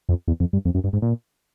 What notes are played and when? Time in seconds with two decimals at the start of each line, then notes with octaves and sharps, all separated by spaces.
0.09 F2
0.28 E2
0.40 F2
0.53 G2
0.65 F2
0.75 F#2
0.84 G2
0.93 G#2
1.02 A#2